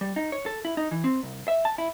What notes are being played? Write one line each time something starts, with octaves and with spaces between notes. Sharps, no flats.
G3
D#4
C#5
A4
E4
D#4
E3
C4
C2
E5
A5
E4